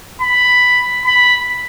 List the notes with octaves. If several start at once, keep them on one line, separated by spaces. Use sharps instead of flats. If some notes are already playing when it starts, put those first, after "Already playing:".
B5
B5